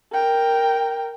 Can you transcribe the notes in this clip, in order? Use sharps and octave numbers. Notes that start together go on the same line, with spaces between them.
A#4 G5